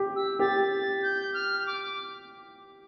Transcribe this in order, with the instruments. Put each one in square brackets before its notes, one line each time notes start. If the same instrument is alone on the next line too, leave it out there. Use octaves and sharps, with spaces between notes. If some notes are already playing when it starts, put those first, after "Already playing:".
Already playing: [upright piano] G4
[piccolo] E6
[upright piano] G4 [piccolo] A6
[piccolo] A6
G6
F6
D6